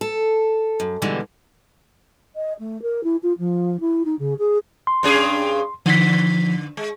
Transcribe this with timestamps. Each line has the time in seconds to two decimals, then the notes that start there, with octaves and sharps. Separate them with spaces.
0.01 A4
0.80 F#2
1.02 B2 D3 E3 G3 G#3
2.34 D#5
2.59 A3
2.82 A#4
3.04 E4
3.23 F4
3.38 F3
3.80 E4
4.05 D#4
4.19 C#3
4.39 G#4
4.87 C6
5.03 G2 C#4 G#4
5.86 D3 F3 B6
6.77 G#3